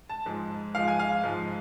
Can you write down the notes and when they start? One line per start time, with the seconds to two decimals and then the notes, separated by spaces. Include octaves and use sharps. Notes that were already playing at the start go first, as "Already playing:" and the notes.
0.09 A5
0.26 G#2 F3 G#3
0.75 G#2 F3 G#3 F5
0.88 G#5
0.99 F5
1.23 G#2 F3 G#3